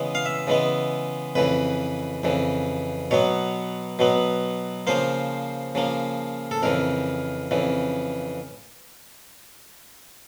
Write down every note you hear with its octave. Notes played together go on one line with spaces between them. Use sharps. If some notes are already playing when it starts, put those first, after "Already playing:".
Already playing: C#3 E3 G#3 B3
F5
E5
C#3 E3 G#3 B3
F2 C#3 E3 B4
F2 C#3 E3
B2 F#3 B3 C#5
B2 F#3 B3
C#3 F3 A#3 C5
C#3 F3 A#3
A4
F2 C#3 E3 A#4
F2 C#3 E3